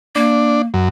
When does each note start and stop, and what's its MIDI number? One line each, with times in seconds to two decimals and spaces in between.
0.15 0.66 58
0.15 0.62 62
0.74 0.89 42